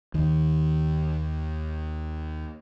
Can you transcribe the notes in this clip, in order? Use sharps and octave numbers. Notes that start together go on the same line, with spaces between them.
D#2 D#3